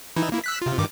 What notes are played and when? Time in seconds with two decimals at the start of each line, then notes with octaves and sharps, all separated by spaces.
0.16 E3 D#4 E4
0.32 A#3 E4
0.44 E6 F#6 B6
0.62 C3 F4
0.78 G2 D#3 D6